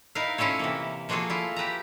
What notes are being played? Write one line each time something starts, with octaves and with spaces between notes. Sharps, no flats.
D#4 E4 A#4 B4 F5
C#4 E4 F4 A4 C#5
C3 E3 A#3
F3 A#3 F4 F#4 G#4 A4
E4 F4
G4 B4 A5 A#5